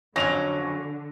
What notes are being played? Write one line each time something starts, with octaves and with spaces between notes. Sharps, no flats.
F2 D3 F#3 C#4 A#6 F7